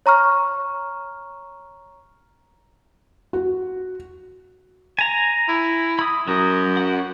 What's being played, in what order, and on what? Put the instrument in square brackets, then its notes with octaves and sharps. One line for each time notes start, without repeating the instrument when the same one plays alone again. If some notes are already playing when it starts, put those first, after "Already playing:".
[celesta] C#5 A#5 C#6 F6
[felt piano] F#4
[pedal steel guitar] G#5 A#5
[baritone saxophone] E4
[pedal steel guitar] B5 D#6
[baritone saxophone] F#2 [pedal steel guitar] F#3 A#5 D#6
[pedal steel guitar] F#5